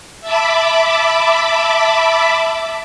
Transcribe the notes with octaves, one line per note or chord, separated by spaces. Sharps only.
E5 A5 B5 D6